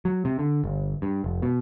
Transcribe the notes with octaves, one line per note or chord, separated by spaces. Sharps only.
F#3
C3
D3
G1
G2
F1
B2